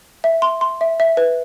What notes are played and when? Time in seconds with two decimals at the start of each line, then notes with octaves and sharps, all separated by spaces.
0.24 E5
0.42 C6
0.61 C6
0.81 E5
1.00 E5
1.17 B4